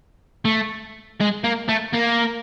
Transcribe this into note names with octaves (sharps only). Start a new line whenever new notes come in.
A3
G#3
A#3
A3
A#3